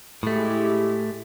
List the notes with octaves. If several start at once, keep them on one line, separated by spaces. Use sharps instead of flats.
A2 G#3 A3 E4 G4